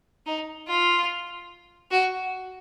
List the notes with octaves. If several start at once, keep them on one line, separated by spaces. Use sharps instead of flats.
D#4
F4
F#4